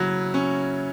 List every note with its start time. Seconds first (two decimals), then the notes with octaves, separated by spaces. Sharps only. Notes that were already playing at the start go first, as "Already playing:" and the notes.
Already playing: C#3 F#3 E4
0.34 C#4